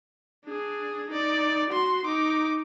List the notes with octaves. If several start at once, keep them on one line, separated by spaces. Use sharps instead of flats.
D4 G#4
D#4 D5
F#4 C6
D#4 D6